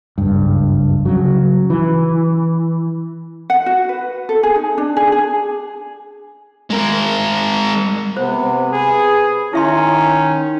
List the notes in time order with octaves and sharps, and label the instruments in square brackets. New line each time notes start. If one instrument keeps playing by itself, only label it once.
[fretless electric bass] F#1 C#2 G2
C#3 F#3
E3
[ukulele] F#5
F#4
B4
A4
G#4
D#4
D4
G#4
G#4
[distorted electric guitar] G#3 A#4
[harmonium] C3 B3 [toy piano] C5
[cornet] G#4 [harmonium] B4
[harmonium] D#3 D#4 [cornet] C#4 [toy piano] E4 E5 C6